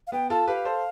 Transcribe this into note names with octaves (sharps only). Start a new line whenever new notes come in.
F5
B3 G5
F4 A4 A5
G4 B4 F5
A4 C5